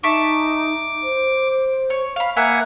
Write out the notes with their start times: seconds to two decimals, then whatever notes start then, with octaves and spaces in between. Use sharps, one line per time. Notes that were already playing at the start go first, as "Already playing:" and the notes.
0.03 D#4 E5 A5 C#6 D6
1.03 C5
1.90 C#5
2.16 F5 B5
2.37 A#3 E4 F#5 G#5